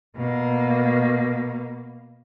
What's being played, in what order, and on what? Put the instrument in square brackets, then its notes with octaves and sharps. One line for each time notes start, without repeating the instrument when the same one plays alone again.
[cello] B2 A#3